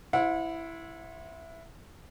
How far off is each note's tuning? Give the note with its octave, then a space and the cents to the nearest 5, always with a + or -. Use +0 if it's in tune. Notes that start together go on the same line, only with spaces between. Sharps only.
E4 +5 C5 +15 F#5 -35